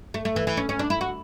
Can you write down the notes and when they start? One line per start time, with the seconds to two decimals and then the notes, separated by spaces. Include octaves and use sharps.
0.14 A3
0.25 A3
0.36 E3
0.47 E3
0.57 C#4
0.69 C#4
0.79 D4
0.90 E4
1.01 F#4